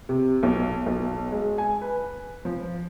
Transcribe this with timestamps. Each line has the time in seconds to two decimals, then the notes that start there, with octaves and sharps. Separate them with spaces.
0.09 C3
0.43 B1
0.86 B1
1.32 G#3
1.58 G#5
1.82 B4
2.45 F3